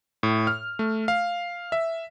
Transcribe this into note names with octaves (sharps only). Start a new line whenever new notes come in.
A2
F6
A3
F5
E5